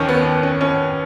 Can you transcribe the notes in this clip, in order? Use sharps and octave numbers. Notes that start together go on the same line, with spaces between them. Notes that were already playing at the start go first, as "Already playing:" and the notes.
Already playing: D#2 D#3 C#4
B3
C#4
C#4